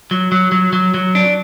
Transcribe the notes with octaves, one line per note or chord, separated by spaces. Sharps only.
F#3
F#3
F#3
F#3
F#3
D4